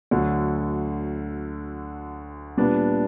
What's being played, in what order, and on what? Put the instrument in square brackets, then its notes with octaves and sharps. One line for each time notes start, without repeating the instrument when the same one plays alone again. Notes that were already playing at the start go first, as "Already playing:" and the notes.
[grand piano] D2 D3 F#3
A#2 G3 B3 D4